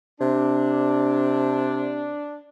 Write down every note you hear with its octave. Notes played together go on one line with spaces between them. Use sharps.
C3 D4